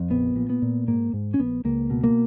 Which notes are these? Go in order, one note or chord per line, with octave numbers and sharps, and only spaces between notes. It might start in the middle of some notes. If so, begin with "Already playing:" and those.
Already playing: F2
A#1 B3
A#2
B3
A#2
G#2 A#3
G#2
C#4
A#1 B3
C#2 A#3
B2
A#3